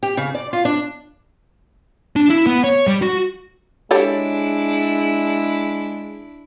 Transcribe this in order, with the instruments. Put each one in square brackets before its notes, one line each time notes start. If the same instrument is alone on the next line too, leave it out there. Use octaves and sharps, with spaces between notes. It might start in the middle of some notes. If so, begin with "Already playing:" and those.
[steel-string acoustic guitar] G4
C#3
D5
F4
D4
[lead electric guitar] D4
E4
B3
C#5
G3
F#4
[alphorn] G#3 [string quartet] D4 E4 [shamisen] G4 A4 C#5